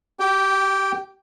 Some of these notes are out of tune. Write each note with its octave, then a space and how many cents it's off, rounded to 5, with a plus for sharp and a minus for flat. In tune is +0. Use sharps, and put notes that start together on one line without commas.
G4 -20 G5 +0